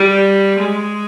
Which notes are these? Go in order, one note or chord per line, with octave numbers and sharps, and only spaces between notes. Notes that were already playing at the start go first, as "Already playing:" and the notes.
Already playing: G3
G#3